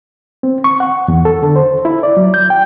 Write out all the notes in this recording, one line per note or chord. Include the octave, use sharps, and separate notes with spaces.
C4
C#6
F#5
E2
A4
D3
C5
E4
D5
F#3
G6
G5